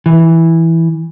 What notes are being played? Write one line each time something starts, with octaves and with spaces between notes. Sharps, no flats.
E3